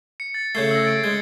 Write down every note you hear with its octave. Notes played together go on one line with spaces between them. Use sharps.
C#7
A6
C#3 A3 G6 G#6 C7
E6 A#6
A6 D7
G#3 G#6